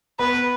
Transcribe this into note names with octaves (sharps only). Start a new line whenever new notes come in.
B3 B4